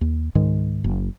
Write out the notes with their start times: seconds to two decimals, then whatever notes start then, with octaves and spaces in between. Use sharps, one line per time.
0.01 D#2
0.35 C#2 G#2 D#3 G#3
0.84 F#1